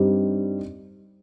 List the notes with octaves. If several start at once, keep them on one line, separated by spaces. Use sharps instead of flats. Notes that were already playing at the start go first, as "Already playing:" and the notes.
Already playing: G2 G3 C4 D#4 G4